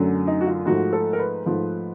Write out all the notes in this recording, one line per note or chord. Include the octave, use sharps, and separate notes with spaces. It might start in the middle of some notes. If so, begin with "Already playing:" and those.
Already playing: F#2 D3 F#3 A3
D#4
F#4
F4
G#2 F3 A3 F#4
A4
A#4
B4
G#2 F3 A3